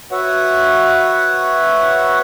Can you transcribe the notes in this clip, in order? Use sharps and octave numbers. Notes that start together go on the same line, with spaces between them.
F#4 B4 C#5 E5 F#5